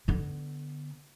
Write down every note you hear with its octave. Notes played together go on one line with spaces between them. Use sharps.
D3 B3